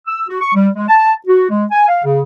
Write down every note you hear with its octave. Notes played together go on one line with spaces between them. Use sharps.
E6
F#4
C#6
G3
G#3
A5
F#4
G#3
G#5
F5
C#3